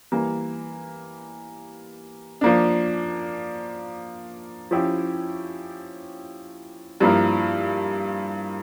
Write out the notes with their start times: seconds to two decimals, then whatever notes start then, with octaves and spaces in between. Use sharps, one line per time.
0.12 E3 G3 A#3
2.41 F3 A#3 D4
4.71 F3 C#4 E4 G4
7.00 G2 F3 A#3 E4 A#4